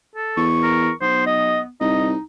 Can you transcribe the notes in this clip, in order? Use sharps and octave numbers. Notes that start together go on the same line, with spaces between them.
A4
E2 C#6
A#4
B1 B3 C5
D#5
C2 D#4 D#5